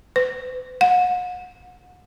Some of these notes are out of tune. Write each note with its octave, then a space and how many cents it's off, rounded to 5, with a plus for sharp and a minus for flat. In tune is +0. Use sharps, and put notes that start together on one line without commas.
B4 +40
F#5 -35